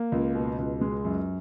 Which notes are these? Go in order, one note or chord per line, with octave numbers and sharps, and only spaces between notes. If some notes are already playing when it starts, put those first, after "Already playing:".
Already playing: A#3
C#2
B2
C#2
G#3
F#2